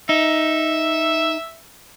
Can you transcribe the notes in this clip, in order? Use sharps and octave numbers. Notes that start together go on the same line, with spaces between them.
D#4 E5